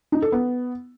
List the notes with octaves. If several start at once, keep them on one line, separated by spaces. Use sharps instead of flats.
D#4
A4
B3